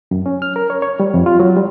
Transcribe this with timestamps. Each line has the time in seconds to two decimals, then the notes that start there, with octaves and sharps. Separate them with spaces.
0.11 F#2
0.26 C#4
0.42 F6
0.56 A#4
0.70 C#5
0.82 C#5
1.00 G3
1.14 F2
1.26 F4
1.40 F#3
1.57 G3